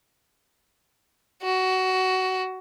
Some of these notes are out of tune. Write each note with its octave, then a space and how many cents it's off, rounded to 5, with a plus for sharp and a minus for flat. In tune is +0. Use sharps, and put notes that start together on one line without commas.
F#4 +15